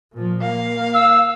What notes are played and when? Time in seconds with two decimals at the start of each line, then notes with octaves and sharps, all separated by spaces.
0.13 A#2 F3
0.42 A#3 F5
0.94 E6